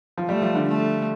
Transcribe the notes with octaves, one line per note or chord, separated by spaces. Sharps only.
F3
G3 A3
F3
D3
A3